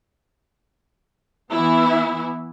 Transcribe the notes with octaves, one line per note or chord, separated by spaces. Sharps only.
E3 B3 E4